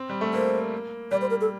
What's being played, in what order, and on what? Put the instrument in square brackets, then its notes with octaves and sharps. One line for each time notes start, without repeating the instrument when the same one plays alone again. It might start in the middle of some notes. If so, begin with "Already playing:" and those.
Already playing: [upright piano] C4
G3
A3
[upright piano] A#3 [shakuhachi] C5
[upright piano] G3 [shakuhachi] D5
[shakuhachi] C5
A#4
A4